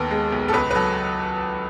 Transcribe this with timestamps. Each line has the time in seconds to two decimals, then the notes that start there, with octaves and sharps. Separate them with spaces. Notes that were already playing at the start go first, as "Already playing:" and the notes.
Already playing: D#2 B3 A4
0.11 G#3
0.32 B1
0.48 A4
0.53 C#2 B4
0.71 B4
0.75 F#3 A4